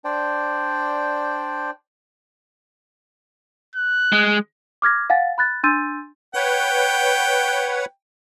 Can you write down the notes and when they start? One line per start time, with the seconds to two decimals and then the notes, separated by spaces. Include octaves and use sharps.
0.05 D4 C5 D5 G5
3.76 F#6
4.13 G#3
4.82 D6 F6 G#6 A#6
5.10 F5 F#5 G#5 A6
5.38 B5 F#6 A6
5.64 D4 C6 E6 G6 A6 D#7
6.35 B4 C#5 F#5 G5